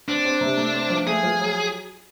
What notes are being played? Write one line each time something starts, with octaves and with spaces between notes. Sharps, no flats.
C4 D4
C4
C3
A3
C4
F3
A3 G#4
F3
F#3